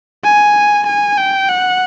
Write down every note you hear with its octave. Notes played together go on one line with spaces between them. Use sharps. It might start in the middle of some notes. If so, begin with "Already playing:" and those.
G#5
G#5
G5
F#5